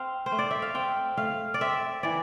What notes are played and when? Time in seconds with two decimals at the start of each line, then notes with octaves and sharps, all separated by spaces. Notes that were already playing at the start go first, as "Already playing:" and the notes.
Already playing: C4 F5
0.26 C5
0.32 A3
0.39 D5
0.51 E5
0.62 F5
0.75 C4 G5
1.17 A3 F5
1.54 D5
1.61 C4 E5
2.03 E3 D5